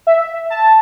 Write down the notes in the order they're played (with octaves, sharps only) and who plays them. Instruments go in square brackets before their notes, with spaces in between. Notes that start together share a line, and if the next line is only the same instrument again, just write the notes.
[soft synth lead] E5
A5